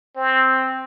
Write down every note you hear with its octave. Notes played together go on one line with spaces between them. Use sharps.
C4